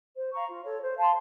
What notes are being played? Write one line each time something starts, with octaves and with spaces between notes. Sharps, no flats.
C5
F5 A#5 C#6
F4
A4 C#5
C5
F5 A5 C6